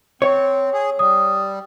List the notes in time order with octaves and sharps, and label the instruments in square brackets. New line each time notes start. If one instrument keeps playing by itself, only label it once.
[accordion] C4 [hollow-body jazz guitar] C#5
[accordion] G#4
[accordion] G3 [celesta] D#6